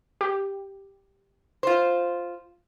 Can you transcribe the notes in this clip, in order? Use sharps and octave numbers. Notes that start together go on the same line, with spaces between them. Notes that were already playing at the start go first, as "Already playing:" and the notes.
G4
F4 C5